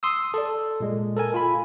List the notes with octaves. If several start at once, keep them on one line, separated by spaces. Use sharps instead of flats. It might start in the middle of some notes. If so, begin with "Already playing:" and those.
C6 D#6 E6
A4 D5
A#2 G#3
A4 A#4 G#5
F4 G#5 B5